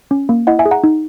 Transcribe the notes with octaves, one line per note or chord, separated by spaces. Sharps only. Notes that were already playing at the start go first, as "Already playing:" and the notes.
C#4
A#3
E4 D#5 F#5
E5 G#5
G#4
F#5 A#5
D#4